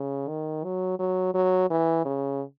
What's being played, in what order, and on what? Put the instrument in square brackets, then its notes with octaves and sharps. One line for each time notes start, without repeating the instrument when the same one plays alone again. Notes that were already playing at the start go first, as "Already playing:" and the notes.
Already playing: [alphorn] C#3
D#3
F#3
F#3
F#3
E3
C#3